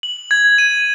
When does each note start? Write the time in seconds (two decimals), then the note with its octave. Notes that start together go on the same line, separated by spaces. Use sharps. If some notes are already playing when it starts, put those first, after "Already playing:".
0.03 F#7
0.31 G#6
0.58 D#7